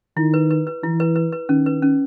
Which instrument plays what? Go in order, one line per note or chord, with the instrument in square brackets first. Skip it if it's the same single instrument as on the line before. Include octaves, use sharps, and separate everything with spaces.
[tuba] D#3 [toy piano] E4
[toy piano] B4
B4
B4
[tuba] E3 [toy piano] E4
[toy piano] B4
B4
B4
[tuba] D#3 [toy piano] C#4
[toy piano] B4
C#4